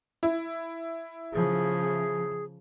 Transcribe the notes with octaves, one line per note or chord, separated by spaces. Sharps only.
E4
C#3 F3 G#4